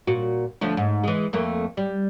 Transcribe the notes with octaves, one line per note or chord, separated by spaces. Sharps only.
A#2 F#4
D2 F3 A3
G#2
E3 G#3
F2 A3 A#3
G3